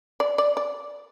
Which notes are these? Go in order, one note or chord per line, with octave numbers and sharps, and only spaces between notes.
D5
D5
D5